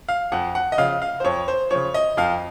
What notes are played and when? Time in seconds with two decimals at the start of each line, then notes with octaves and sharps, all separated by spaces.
0.09 F5
0.32 F2 F#5
0.55 F#5
0.72 D#5
0.78 C#3 F3 F5
1.02 F5
1.20 C5
1.24 F2 C#5
1.48 C5
1.71 C#3 F3 C#5
1.94 D#5
2.17 F2 F5